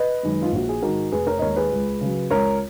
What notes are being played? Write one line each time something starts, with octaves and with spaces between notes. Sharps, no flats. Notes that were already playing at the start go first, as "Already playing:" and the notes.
Already playing: B4 D#5
F#2 D#3 G#3
F4
A#1 F#4
G#4
G#2 D#3 G#3 F#4 A#4
F1 G#4 B4
A#4 C#5
D#5
D#2 D#3 G#3 A#4 C#5
G#4 B4
C#2
C#3 F#3
C#2 A#4 C#5